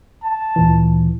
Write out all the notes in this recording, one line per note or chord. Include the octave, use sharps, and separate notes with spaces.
A5
D2 A#2 E3